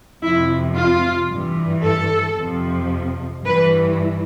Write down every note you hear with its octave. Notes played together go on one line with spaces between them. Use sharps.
F2 C3 F3 E4
F4
G2 E3
A4
F2 C3 F3
G2 E3 B4